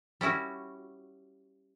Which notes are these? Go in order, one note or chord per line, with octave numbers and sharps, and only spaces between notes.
G3 C#4 E4 F#4